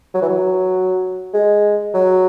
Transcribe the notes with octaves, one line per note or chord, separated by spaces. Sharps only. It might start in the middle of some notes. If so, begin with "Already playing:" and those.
F#3
E3
F#3
G#3
F#3